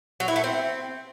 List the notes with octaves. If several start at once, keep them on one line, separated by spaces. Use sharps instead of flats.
F#3
E4
A3
C4